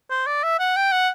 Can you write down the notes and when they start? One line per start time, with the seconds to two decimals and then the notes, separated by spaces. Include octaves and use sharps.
0.10 C5
0.27 D5
0.43 E5
0.60 F#5
0.76 G5
0.92 F#5